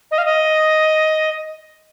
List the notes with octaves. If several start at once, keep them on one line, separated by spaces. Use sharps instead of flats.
D#5
F5
D#5